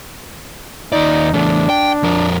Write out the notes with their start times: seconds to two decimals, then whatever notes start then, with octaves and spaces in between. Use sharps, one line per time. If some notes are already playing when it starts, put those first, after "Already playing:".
0.92 D#2 D#4 D5
1.34 E2 A3 D4
1.69 G5
2.03 F2 A#4